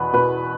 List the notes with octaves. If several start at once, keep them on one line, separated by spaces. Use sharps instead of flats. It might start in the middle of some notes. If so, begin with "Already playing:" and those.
Already playing: E2 B2 B4
B2 B4